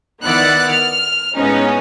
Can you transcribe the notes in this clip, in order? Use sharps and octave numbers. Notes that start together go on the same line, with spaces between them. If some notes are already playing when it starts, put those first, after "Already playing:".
D#3 B3 E4 D5 F#5 F#6
F6
A2 G#3 B3 C#4 D#4